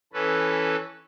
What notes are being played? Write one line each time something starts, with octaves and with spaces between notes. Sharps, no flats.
E3 C#4 A4 B4